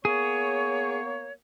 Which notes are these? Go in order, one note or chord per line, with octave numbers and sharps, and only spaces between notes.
A#3 B3 G#4 C#5